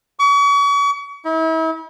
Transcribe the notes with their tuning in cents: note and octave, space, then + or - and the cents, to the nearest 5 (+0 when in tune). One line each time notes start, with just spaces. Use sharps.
C#6 +40
E4 -40